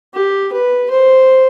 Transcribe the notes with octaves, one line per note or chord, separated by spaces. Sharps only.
G4
B4
C5